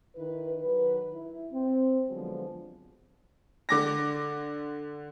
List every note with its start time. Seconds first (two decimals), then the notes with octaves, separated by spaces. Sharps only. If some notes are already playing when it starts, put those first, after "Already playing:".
0.16 D#3 E4 B4
0.61 D#3 F#3 B4
1.13 E4
1.52 C4
2.09 D3 F3 F#3 G#3 B3
3.69 D3 D6 A#6